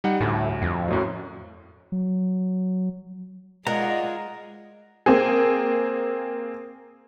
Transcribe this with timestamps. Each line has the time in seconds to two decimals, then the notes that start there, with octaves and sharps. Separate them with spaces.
0.04 G3 D#4 F#5
0.21 D2 A2
0.62 F2
0.88 F#2 A2 F#3
1.92 F#3
3.67 G#2 G#3 F4 A#4 D5 D#5 F#5 A#5
5.06 A#3 C4 G#4